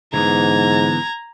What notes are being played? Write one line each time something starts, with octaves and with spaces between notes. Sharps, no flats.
G#2 D3 E3 B3 A#5 G#6